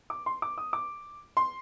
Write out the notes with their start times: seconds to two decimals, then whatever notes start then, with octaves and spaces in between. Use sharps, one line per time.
0.10 D6
0.26 C6
0.42 D6
0.58 D#6
0.73 D6
1.37 C6